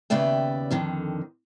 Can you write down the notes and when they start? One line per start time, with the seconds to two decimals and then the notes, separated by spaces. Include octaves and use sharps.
0.10 D#2 C#3 B3 D5 E5 G5
0.71 F2 D3 D#3